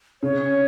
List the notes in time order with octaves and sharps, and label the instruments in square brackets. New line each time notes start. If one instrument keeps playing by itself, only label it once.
[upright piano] C#3 [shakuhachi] C#5